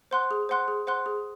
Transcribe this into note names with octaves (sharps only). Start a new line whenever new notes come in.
C5 F#5 C6 F#6
G#4
C5 F#5 C6 F#6
G#4
C5 F#5 C6 F#6
G#4